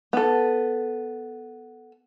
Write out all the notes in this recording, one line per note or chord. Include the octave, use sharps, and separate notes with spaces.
B3 A4